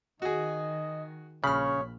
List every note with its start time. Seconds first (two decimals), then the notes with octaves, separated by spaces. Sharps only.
0.22 D#3 F#4 G#4 D#5
1.44 A#1 C#3 C#5 B5 F6